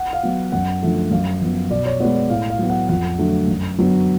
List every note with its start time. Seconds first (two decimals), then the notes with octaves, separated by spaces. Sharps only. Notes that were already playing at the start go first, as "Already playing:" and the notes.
Already playing: F#5
0.13 F5
0.23 F#3 B3
0.52 F#2 F#5
0.83 D3 F3 A3
1.11 F#2 F5
1.41 F3 B3
1.71 B2 D5
1.86 C#5
2.00 G#3 B3 D5
2.15 D5
2.30 A2 F5
2.50 F5
2.59 F#3 B3
2.70 F#5
2.89 F2 F#5
3.18 D3 F#3 A3
3.48 F#2
3.78 D3 F#3 B3